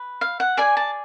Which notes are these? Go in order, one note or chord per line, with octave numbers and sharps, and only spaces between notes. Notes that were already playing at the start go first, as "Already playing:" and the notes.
Already playing: B4
F5
F#5
G#4 D5 G#5
A5